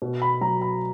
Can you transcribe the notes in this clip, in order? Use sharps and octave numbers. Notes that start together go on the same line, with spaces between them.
B2
B5
F#3 A#5
B5